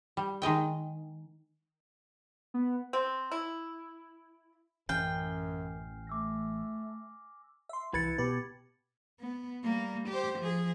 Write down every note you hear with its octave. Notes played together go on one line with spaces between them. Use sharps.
G3
D#3 G#3 D#5 G5
B3
C4
E4
A1 F#2 E3 C#4 G5 G#5 F6 C7
A3 D6 E6 A#6
E5 C6
C2 E3 E4 B4 G#6 A6 C#7
B2 G4 B4
B3
G3 A#3
G4 C5
F3 G#4